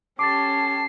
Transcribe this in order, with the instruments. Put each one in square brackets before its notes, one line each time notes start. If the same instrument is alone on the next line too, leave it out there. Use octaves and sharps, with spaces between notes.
[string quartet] C#4 G4 A4 [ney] A5 [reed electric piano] D6 A6 [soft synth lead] C7